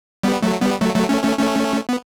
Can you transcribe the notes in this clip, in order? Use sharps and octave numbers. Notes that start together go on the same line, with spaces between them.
G3 B3
F#3 A3
G3 B3
F#3 A3
F#3 A3
A3 C#4
A3 C#4
A3 C#4
B3